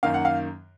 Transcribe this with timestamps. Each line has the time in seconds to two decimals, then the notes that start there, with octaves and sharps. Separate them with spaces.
0.03 F#2 D#3 A#3 F5
0.14 F#5
0.25 F5